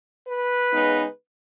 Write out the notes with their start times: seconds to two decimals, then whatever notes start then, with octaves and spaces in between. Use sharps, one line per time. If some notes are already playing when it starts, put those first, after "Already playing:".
0.26 B4
0.72 C#3 G#3 B3 D#4